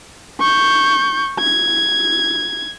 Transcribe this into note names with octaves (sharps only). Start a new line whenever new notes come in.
C#6 G6
G#6